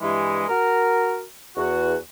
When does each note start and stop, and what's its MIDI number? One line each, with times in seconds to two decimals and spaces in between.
0.01 0.44 43
0.01 0.44 52
0.01 0.44 56
0.48 1.22 66
0.48 1.22 70
1.57 1.94 40
1.57 1.94 66